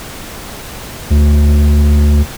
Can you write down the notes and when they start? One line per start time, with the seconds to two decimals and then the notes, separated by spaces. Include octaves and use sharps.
1.10 D2